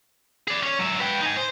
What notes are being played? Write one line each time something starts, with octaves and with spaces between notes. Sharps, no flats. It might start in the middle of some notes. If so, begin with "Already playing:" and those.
G#4 D5
C#4
F#3 E5
B4 G5
D#4 G#5
C5